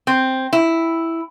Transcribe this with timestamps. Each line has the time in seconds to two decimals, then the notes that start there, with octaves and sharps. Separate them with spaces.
0.07 C4
0.53 E4